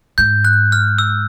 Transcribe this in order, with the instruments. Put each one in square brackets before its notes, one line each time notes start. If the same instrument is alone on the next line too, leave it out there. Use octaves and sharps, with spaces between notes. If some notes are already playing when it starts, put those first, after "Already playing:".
[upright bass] G#2 [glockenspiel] G6
[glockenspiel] F#6
F6
E6